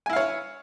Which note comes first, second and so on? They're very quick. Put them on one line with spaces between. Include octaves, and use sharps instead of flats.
G#5 E4 F5 C#5